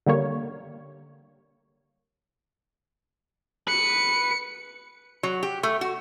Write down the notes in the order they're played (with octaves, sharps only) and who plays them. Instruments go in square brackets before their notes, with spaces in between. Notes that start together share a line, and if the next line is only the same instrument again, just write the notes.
[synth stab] D3 G3 A#3 C#5
[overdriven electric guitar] B4 [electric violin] C#7
[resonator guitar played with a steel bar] F#3
G4
A3
F#4